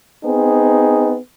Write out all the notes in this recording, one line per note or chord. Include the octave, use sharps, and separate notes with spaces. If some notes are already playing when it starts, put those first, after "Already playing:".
B3 C4 D#4 G#4